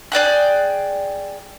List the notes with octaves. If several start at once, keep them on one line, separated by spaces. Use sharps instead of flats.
G#4 D5 G5 F#6